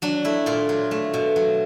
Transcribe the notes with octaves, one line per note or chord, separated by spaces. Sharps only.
F#3 D4
A3 E4
A#2 F4
F#3
A3
B2
F#3